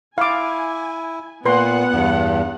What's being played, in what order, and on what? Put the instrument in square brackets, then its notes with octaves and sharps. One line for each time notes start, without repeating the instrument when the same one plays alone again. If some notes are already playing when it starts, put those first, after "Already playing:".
[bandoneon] E4 [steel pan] F5 D6 [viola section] G#5
[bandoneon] A#2 [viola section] B3 F#5 [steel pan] B4 C6
[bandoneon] E2 G2